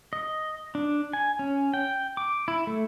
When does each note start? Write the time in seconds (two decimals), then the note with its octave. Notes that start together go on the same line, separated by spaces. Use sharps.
0.13 D#5
0.75 D4
1.13 G#5
1.39 C#4
1.74 G5
2.17 D6
2.48 E4
2.67 A3